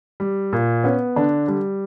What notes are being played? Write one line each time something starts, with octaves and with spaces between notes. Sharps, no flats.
G3
A#2
B3 C#4
D3 D4
G3